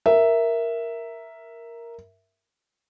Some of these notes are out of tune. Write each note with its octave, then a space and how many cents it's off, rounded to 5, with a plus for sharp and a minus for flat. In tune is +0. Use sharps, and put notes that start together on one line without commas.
A#4 +0 E5 +0